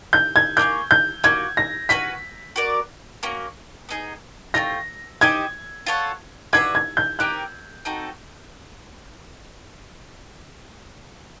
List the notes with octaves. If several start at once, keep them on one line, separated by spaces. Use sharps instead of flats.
G6
G#6
A#3 D#4 G#4 C#5 G6
G6
A#3 C#4 F#4 G#6
A#6
C#4 F#4 B4 B6
F#4 A#4 D5
A#3 C#4 F#4
B3 D#4 G#4
A3 C4 F4 A#6
D#4 G4 C5 D#5 G#6
F4 A4 C#5 F#5
D4 F#4 B4 E5 G#6
G#6
G6
C4 D#4 G4 A#4 F#6
C4 D#4 F#4 A4